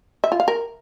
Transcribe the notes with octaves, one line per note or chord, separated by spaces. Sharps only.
E5
F4
F5
A#4